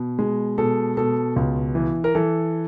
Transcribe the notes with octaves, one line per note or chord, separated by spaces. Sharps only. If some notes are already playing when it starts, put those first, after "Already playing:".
Already playing: B2
G#3
B2 A4
B2 A4
C#2
E3
A#4
E3 A4